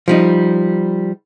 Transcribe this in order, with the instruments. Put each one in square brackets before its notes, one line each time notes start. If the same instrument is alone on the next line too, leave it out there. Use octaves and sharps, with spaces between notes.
[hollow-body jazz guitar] F3 G3 D#4